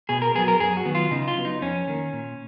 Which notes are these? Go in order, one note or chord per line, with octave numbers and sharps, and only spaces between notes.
B2 G#4
A#4
F#3 B3 G#4
A#4
F#2 G#4
F#4
D#3 F#3 B3
F4
C#3 D#4
F4
F#3 B3
D#4
F2 C#4
D#3 A#3
A#2